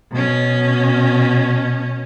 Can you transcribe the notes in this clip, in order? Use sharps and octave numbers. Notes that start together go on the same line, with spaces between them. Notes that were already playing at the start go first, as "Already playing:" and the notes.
B2 C#4